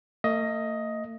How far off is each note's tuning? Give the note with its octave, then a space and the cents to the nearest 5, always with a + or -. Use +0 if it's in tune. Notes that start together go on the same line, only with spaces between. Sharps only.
A3 +45 D#5 +10